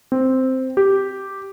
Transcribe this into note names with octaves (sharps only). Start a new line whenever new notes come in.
C4
G4